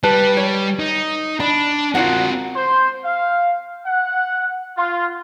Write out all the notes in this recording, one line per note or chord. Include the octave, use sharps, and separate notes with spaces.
G3 B4 A5
C#5
D#4
D4 B5
C4 F4 F#4 A#4 F#5
C5
F5
F#5
F4